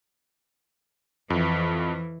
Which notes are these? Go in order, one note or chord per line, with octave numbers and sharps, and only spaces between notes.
F2 E3